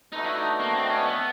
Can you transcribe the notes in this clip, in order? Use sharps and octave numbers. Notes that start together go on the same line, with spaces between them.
A3 D4 D#4 F#4 B4 D#5
E4
D#4
A#3
C4
C#4
B3